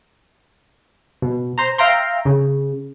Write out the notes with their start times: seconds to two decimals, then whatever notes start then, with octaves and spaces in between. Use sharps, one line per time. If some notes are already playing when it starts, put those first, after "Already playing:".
1.22 B2
1.58 C5 A#5
1.78 E5 F5 G5 A#5 C6
2.25 C#3